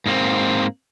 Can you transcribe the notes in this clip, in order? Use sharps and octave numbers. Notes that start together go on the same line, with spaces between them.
G#2 A#3 C4